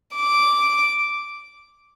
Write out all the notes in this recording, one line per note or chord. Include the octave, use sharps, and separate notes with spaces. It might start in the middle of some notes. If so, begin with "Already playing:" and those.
D6